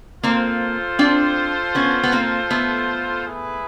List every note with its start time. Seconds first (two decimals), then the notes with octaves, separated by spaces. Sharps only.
0.23 A#3 C4 F4 A4 C5
0.99 C4 D4
1.75 B3 C#4
2.03 B3
2.12 A#3 C4
2.50 A3 B3
3.25 E4 G#4 B4